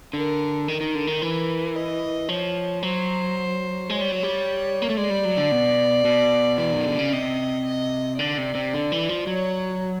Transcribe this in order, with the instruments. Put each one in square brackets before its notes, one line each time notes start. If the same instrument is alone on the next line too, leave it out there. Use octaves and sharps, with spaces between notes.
[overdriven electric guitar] D3 [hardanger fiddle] A#4
[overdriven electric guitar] D#3 [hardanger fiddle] A#4
[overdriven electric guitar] D#3
D3
D#3
E3
[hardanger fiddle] D#5
[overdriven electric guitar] F3 [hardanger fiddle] C#5
[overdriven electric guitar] F#3 [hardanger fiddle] C5
[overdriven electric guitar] G#3 [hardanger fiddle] C#5
[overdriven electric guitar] G3
F#3
G3
A#3
A3
[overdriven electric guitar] G#3 [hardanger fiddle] D5
[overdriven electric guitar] G3
F#3
D3
B2
B2
[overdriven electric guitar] E3 [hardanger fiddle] D5
[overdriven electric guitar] D#3
D3
C#3
[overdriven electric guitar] C3 [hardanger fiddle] D#5
[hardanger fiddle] D#5
[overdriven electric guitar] D3 [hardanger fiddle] D5
[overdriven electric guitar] C3
C3
D3
E3
F3
[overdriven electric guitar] F#3 [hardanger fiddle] C#5